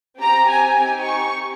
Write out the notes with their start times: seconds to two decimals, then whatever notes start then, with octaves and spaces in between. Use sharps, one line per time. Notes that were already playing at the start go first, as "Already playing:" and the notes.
0.19 C4 G4 A#5
0.49 G#5
0.78 C4 D#4 G4 G#5
1.06 C#6